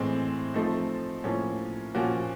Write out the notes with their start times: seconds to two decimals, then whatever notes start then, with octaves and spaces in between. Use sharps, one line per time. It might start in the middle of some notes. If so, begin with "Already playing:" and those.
Already playing: A2 E3 G#3 C4
0.54 F3 A3 C4 D#4
1.24 A2 F3 A#3 C#4
1.95 A#2 F3 A#3 C#4 F#4